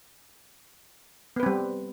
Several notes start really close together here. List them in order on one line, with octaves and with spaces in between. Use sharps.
B3 B4 C4 G3